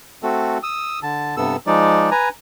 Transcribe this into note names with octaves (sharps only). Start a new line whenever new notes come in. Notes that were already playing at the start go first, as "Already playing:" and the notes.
A3 C4 F#4 A4
D#6 E6
D3 A5
G2 C3 B3 A4 E6
F3 G#3 D#4 D5
B4 G#5 A#5